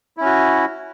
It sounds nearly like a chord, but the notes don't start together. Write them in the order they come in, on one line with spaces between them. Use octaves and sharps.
E4 C#4 F#4